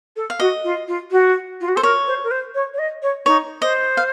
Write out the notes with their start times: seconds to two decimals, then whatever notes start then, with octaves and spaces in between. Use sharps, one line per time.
0.16 A4
0.30 F5
0.40 F#4 D#5
0.64 F4
0.88 F4
1.11 F#4
1.60 F4
1.68 F#4
1.76 A4 C5
1.83 A#4 C#5
2.07 C5
2.24 A#4
2.31 C5
2.54 C#5
2.73 C#5
2.78 D#5
3.02 C#5
3.26 D#4 C#5
3.62 C5 D#5
3.97 F5